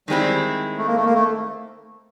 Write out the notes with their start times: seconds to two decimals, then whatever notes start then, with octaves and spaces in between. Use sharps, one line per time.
0.08 D#3 G3 G#3 C4 E4
0.78 A3
0.87 A#3
0.96 A3
1.05 A#3
1.14 A3